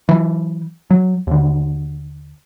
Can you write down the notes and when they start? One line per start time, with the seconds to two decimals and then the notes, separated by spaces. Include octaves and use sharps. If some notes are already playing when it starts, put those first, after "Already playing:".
0.09 E3 F#3
0.91 F#3
1.27 D#2 D3